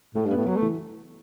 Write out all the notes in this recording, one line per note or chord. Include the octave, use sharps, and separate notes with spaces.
A2 A3
G2
B3
A2
F#3 B3
A3
E3